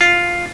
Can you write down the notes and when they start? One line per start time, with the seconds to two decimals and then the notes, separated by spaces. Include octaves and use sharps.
0.01 F4